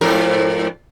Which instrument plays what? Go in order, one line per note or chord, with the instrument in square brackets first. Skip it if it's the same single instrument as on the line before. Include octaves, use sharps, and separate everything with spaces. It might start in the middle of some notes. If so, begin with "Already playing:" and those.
[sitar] F2 G#2 A#4